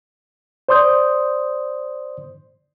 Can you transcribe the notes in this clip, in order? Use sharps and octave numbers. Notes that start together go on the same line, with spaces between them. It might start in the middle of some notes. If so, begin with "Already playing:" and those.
C5 D5 C6 D#6 G6